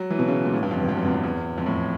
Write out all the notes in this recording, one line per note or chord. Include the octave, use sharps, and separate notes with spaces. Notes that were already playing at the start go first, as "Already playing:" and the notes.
Already playing: F#3
E3
B2
C#3
A#2
A2
G2
F2
E2
F2
F#2
E2
F2
E2
F2
A2